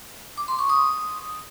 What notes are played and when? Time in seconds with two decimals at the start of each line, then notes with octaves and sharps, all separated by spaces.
0.37 D6
0.48 C6
0.59 C#6
0.69 D#6